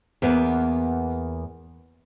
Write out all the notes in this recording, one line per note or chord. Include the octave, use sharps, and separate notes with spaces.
E2 A#3 B3